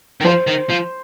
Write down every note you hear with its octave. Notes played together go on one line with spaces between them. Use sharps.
D#3
F3 C5
D#3
F3